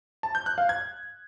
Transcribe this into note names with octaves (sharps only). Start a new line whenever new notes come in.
A5
G6
F#6
F5
G#6